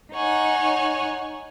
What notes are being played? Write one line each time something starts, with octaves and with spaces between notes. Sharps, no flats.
D#4 C#5 F#5 G#5